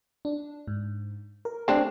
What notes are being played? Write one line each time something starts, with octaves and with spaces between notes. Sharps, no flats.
D4
G#2
A#4
A3 C4 D4 G4